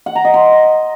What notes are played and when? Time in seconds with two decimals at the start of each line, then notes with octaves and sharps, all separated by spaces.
0.06 F#5
0.15 A#5
0.25 D#5
0.34 C6